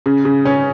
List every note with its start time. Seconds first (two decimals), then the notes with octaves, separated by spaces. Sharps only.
0.06 C#3
0.25 C#3
0.45 C#4